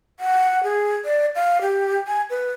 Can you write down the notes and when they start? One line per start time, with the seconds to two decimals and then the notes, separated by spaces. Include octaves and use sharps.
0.20 F#5
0.63 G#4
1.05 D5
1.35 F5
1.61 G4
2.07 G#5
2.30 B4